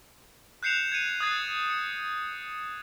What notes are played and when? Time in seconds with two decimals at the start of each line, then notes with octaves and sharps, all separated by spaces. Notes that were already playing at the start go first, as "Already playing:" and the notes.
0.63 F#6 G6 C7 C#7 E7 F7
0.92 G#6 C#7 D#7
1.20 D#6 F#6 G#6 A6 C7 D#7
1.70 C#7